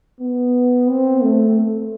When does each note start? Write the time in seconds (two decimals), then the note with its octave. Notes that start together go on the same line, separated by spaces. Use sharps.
0.19 B3
0.88 C4
1.23 A3